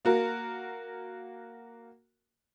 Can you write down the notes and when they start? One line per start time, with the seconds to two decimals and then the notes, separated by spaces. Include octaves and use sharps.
0.05 A#3 F#4 A#4